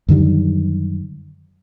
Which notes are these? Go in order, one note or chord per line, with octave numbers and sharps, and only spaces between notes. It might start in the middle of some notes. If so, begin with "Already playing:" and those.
F#2 D3 D#3 G3